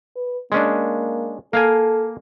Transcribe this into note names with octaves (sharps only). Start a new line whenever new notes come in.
B4
G#3 A#3 C#4 D4
A#3 A4 F5 G#5